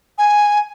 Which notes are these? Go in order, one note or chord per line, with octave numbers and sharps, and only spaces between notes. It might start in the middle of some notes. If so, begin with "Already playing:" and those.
G#5